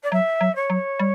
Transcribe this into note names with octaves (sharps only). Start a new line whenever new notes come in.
D5
F#3 E5
F#3
C#5
F#3
G3